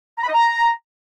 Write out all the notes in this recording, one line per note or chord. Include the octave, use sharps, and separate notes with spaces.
A#5
B5
D#5
A#5